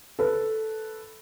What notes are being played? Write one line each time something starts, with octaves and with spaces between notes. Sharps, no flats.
A4 B4